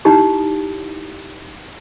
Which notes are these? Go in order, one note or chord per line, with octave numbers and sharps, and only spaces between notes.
D#4 E4 G4 A#5